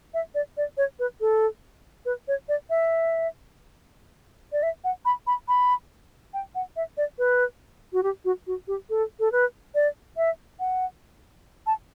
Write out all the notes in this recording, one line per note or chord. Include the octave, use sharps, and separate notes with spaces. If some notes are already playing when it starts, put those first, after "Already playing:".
E5
D5
D5
C#5
B4
A4
B4
C#5
D5
E5
D5
E5
F#5
B5
B5
B5
G5
F#5
E5
D5
B4
F#4
G4
F#4
F#4
G4
A4
A4
B4
D5
E5
F#5
A5